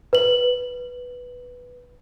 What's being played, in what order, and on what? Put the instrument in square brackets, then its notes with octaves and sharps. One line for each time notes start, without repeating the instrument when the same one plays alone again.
[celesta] B4 F#7